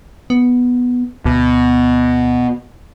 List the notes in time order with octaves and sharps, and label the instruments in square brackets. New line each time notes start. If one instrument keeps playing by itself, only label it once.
[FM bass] B3
[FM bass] D2 [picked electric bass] B2